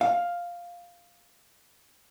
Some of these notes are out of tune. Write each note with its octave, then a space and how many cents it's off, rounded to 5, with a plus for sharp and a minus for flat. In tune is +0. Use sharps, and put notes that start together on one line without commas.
F5 +0